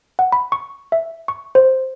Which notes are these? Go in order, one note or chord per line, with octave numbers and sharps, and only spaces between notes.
F#5
B5
C#6
E5
C#6
C5